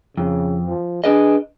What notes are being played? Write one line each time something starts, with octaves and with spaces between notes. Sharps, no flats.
F2 C#3
F3
D4 G#4 B4 D#5